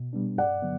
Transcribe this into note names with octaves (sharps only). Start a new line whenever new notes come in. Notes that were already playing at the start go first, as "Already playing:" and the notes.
Already playing: B2
G3 B3 D4
G2 D5 F#5
D3 F#3 B3